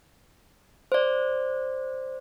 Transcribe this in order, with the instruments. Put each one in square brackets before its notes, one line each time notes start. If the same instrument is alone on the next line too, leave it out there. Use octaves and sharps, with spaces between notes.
[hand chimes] C5 D5